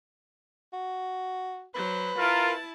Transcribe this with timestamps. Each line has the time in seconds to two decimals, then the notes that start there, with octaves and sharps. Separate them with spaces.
0.73 F#4
1.75 F#3 B4 C5
2.18 E4 F4 A#4 A5